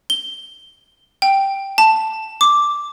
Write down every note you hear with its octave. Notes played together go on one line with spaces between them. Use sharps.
G7
G5
A5
D6